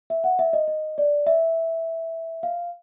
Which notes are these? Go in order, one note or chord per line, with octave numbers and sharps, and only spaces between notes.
E5
F#5
E5
D#5
D#5
D5
E5
F5